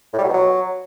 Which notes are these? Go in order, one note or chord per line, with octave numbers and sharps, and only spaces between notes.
A2
G3
F#3
B2
F#3